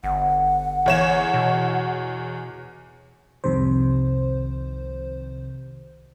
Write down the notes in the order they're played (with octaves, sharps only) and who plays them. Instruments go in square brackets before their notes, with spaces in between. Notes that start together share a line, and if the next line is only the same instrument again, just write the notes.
[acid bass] G1 [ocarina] F#5
[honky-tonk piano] E2 C#5 E7
[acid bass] B2
[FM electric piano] C2 F2 C3 D#3 C5